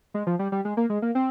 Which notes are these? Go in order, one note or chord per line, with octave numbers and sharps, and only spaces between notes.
G#3
F3
G3
G3
G#3
A#3
G#3
A#3
C4